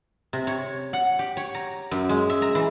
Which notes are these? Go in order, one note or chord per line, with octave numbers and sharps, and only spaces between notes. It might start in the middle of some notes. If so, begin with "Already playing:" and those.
C3
C#5
F#5
G4
C#5
A#5
F#2
G#3
E5
A#5
E3